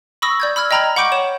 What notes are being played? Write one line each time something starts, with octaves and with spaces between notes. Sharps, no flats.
B5 C#6 D#6 E6 A#6
D5 G6 G#6
B5 E6 F6 G#6
D#5 G5 A#5 B5 F6 G#6
F#5 B5 C#6 D6 G6 D7
C#5 E7